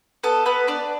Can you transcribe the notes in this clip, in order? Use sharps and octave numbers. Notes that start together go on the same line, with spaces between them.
B3 A4
B3 B4
D4 D5